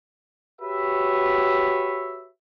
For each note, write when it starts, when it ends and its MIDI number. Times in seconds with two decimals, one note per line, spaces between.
0.60 2.28 66
0.60 2.28 67
0.60 2.28 71
0.60 2.28 73
0.60 2.28 76